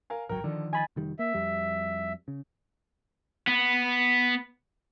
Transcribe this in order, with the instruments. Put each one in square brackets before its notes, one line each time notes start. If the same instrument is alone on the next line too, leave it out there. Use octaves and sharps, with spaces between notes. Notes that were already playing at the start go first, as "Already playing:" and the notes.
[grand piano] A#4 F5 G#5
[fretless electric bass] D1 G#1 F#3 [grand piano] A#4 G5
[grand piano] D3 [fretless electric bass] D#3 F3
[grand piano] D#5 [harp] G#5 B5 A6
[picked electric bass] F1 D#3 G3
[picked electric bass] A#3 [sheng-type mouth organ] E5
[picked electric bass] F2 G3
C#3
[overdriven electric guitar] B3